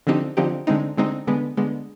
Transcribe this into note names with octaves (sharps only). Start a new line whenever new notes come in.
D3 F3 C4 D#4 G4
D3 F3 C4 D#4 G4
D3 G#3 C4 D#4
D3 G#3 C4 D#4
D3 G#3 B3
D3 G#3 B3